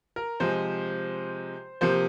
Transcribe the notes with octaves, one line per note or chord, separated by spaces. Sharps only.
A#4
C3 F3 G#3 C5
C3 F3 A#3 C5